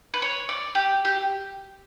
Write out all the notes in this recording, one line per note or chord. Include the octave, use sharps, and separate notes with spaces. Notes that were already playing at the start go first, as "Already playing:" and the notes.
B4
C#5
D5
G4
G4